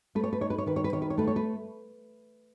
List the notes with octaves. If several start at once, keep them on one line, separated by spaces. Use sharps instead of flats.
A3 B4
C#5
B4
D#4 C#5
B4
C#5
D#3 B4
C#5
B4
D#3 C#5
B4
C#5
A3 B4
C#5
B4